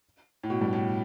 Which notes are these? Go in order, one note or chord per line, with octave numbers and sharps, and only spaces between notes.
A2
B2
G2
A2